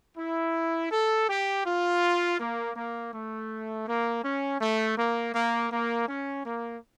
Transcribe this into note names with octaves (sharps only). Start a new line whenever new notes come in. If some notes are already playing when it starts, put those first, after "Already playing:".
E4
A4
G4
F4
A#3
A#3
A3
A#3
C#4
A3
A#3
A#3
A#3
C#4
A#3